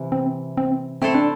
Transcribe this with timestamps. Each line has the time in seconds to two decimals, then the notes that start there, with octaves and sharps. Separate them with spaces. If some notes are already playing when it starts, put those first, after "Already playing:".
Already playing: C3 E3
0.12 C4
0.57 C4
1.02 A3 C4 E4 A4 C5
1.15 D4